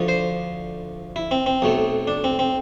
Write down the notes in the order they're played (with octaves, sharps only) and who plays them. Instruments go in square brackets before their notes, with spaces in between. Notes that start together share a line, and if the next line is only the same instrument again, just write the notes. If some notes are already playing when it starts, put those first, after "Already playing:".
Already playing: [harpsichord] D2 D3 F3
C5
E4
C4
C4
B1 B2 A3
D4
C4
C4